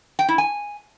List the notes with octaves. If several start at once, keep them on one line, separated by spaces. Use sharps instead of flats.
G5
E4
G#5